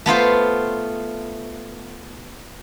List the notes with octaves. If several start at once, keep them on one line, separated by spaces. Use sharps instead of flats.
A3 B3 F4 C5